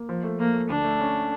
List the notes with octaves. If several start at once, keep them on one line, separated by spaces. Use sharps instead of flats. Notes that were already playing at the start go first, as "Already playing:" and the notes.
Already playing: A#3
F3
A3
F3 A#3
A3
D2 D4
A3
C#4